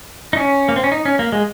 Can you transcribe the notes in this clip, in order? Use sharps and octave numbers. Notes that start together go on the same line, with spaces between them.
D#4
C#4
A#3
C4
C#4
D#4
C#4
A#3
G#3